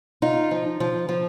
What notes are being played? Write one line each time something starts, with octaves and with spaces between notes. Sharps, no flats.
D#4 F4
F3
F3
F3